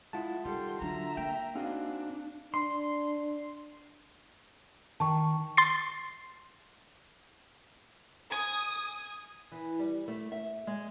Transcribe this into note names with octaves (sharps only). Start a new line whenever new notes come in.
G#3 E4 F4 F#5 A5
D#3 G3 G4 A4 C6
D3 F#3 E5 A#5
A#3 G5
C4 D4 D#4 F#4 G#4 F5
D4 C6
D#3 A5 C#6
C6 A6 C7
G#5 D#6
E3
G3
A3
E5
G#3